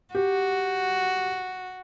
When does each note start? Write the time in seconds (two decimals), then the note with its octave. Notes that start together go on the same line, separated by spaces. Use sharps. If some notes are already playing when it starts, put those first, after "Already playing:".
0.15 F#4 G4